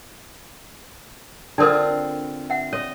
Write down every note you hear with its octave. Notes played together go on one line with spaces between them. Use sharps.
D3 C4 D4 F4 A4 A#4
E5 F#5
C#5 D#5